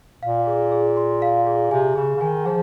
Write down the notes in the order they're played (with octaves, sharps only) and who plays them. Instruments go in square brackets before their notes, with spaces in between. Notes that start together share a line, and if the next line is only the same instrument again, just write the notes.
[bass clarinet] A#2 [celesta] F5
[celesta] G#4
G#4
C6
F5
G#4
[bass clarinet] C3 [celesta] G#5
[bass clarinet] C#3 [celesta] G#4
[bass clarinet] C#3
[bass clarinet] D#3 [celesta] G#5
[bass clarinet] F3 [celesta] G#4